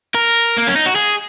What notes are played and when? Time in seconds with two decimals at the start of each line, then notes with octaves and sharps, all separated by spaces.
0.15 A#4
0.58 A#3
0.67 C#4
0.76 D#4
0.86 F#4
0.95 G#4